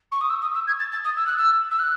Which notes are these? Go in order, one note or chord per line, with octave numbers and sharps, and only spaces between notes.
C#6
D#6
E6
D#6
E6
G#6
A6
A6
D#6
E6
F#6
E6
E6
F#6